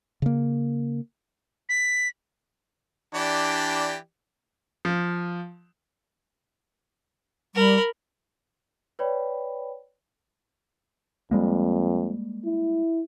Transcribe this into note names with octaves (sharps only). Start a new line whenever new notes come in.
C#3 A#3
B6
E3 D4 G4 D5
F3
G3 A#4 B5
B4 C#5 D5 G5 B5
F2 G3 G#3 A#3
E4